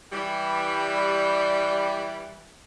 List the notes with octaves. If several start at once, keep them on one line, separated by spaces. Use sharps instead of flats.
E3 G3